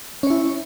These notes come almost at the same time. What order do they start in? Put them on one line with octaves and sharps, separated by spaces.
C#4 C#5 E4